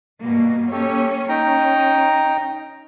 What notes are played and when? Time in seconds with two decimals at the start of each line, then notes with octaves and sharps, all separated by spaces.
0.20 G2 B2 A#3
0.71 A#3 C#4 G4 A4 C#5
1.29 C#4 D#4 G5 A#5